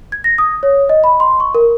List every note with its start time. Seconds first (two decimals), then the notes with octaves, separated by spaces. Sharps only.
0.12 G#6
0.24 A#6
0.38 D#6
0.63 C#5
0.89 D#5
1.04 B5
1.20 C6
1.40 C#6
1.55 A#4